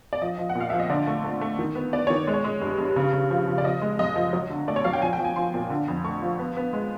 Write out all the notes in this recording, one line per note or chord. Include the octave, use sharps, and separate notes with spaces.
D5
F3 D#5
F3
F#5
A#2 F5
F3 E5
D#5
D3 D5
A3
A3
A3
D#3
B3
B3 D5
D#3 C#5
G#3
C#5
G#3
G2
G2
C#3
C#3
F3
F3
D5
F3 D#5
G#3
F#2 D#5
F3
F#3
D3
A3 D5
C#5
F#3 F5
G5
F3 G#5
G5
F3
G#5
F3 C6
A#2
D3
F2
A3 C#6
F3
B3
B3
G#3